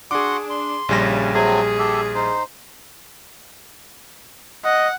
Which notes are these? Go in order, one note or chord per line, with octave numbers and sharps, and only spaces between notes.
D4 F#4 G#4 F#5 C6 D6
C6
A#1 C#3 G3 A#6
F#3 A3 C4 G#4
G4 A4 E5
D#4 C5
D#5 F#5